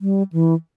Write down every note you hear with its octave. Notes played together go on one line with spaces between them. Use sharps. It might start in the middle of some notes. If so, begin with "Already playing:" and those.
G3
E3